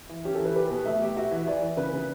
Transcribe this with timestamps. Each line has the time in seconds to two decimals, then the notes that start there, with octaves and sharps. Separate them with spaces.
0.09 E3
0.25 C#4 G4
0.35 A4
0.40 E3
0.45 B4
0.56 G4 B4
0.70 B2
0.85 A3 E5
1.01 G4
1.17 F#4 E5
1.31 E3
1.46 E3 D5
1.62 E3
1.77 C#3 B4
1.93 C#3